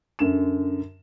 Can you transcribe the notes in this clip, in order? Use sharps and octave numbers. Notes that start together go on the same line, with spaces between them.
F#2 D3 E7